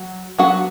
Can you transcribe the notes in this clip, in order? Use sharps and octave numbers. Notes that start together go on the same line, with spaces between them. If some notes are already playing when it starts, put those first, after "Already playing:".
Already playing: F#3
F#3 B3 D4 F#4 F#5